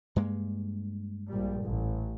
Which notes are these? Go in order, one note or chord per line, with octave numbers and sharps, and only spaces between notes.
G2 G#3 A#3
A#1 A#2 G3
A1